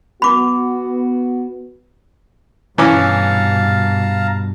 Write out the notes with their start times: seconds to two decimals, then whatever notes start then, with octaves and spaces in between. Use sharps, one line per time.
0.22 B3 F#4 B5 D6
2.78 G2 B2 E3 C#4 F5 A5 A#5 D6